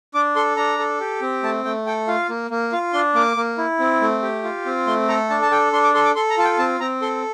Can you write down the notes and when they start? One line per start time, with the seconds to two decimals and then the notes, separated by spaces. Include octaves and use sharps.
0.14 D4 D6
0.36 A4 C6
0.57 D4 A#5
0.79 A4
1.00 G4
1.21 C4
1.43 A3 A5
1.64 A3 G5
1.86 A4 G5
2.08 F4 F5
2.29 A#3
2.51 A#3
2.72 F4 F5
2.93 D4 C6
3.15 A#3 D6
3.37 A#3
3.58 E4
3.79 C4
4.01 A3
4.22 G4
4.44 F4
4.66 C4
4.87 A3 C6
5.08 A4 A#5
5.30 D4 A5
5.42 A5
5.51 A4 G5
5.73 D4 C6
5.84 D6
5.95 A4 C6
6.05 D6
6.15 A4 C6
6.30 A#5
6.38 F4 A5
6.44 G5
6.59 C4 A5
6.80 C4 A#5
7.02 A4 C6